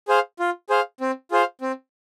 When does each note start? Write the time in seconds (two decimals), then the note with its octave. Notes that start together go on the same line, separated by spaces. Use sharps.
0.08 G#4 C5 F5
0.39 F4
0.69 G#4 C5 F5
1.01 C4
1.31 F4 G#4 C5 F5
1.61 C4